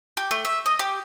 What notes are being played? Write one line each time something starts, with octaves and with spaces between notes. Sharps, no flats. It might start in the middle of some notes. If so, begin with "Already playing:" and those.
G4
A3
E5
D#5
G4